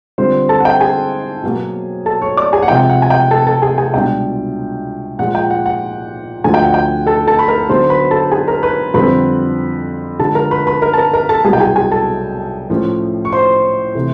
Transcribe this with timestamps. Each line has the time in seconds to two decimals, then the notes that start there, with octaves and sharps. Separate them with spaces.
0.18 D3 G3 C4 F4 C5 C6
0.49 A4 A5
0.60 F#5
0.65 G5
0.81 G#4 G#5
1.43 B2 F#3 A#3
2.06 A4 A5
2.22 C#5 C#6
2.37 D5 D6
2.53 G#4 G#5
2.62 F#5
2.68 C3 F3 G#3 G5
2.89 F#5
3.02 G#5
3.10 G5
3.31 A4 A5
3.47 A4 A5
3.62 G#4 G#5
3.78 G#4 G#5
3.94 C#2 B2 G3 B3 D4 G5
5.19 A#2 F3 G#3 F#5
5.35 G5
5.50 F#5
5.66 F#5
6.44 D2 D3 F3 G#5
6.54 G5
6.64 F#5
6.74 G5
7.06 A4 A5
7.27 A4 A5
7.39 B5
7.48 A#4 A#5
7.69 D3 F#3 B3 D#4 C5 C6
7.90 B4 B5
8.11 A4 A5
8.31 G#4 G#5
8.48 A#4 A#5
8.63 B4 B5
8.94 F2 D3 G3 C4 B4 B5
10.19 D3 F3 G#3 A4 A5
10.35 A#4 A#5
10.51 B4 B5
10.67 B4 B5
10.82 A#4 A#5
10.93 A5
10.98 A#4 A#5
11.13 A#4 A#5
11.29 A4 A5
11.45 C2 B2 F#3 G#4 G#5
11.53 G5
11.60 G#4 G#5
11.76 G#4 G#5
11.92 A4 A5
12.70 A2 F3 A3 C#4
13.25 C#6
13.32 C5 C6
13.95 C3 E3 A3